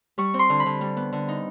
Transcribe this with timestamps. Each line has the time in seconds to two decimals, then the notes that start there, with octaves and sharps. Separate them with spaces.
0.18 G3 C#6
0.34 C4
0.39 C6
0.50 D3
0.60 B5
0.66 D3
0.81 G3
0.97 B3
1.13 D3
1.28 D#4